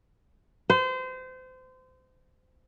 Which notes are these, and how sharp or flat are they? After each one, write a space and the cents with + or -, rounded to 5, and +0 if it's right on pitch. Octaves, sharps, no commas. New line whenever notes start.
C5 -30